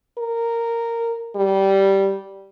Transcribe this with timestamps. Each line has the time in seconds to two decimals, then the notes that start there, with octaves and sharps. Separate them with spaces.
0.18 A#4
1.36 G3